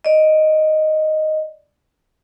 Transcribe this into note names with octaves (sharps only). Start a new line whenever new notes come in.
D5 D#5